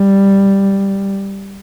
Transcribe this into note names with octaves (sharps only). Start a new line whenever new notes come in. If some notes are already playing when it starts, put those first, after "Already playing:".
Already playing: G3